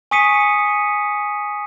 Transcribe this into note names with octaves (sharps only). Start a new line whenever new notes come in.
G#5 C#6 D#6 B6 C#7 D#7